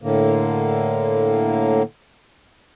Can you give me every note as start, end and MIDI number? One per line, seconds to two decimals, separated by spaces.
0.02 1.82 45
0.02 1.82 50
0.02 1.82 58